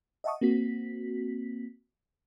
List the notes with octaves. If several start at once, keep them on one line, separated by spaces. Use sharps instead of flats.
D#5 E5 F#5 A5 C#6 D#6
A#3 C4 F#4 B6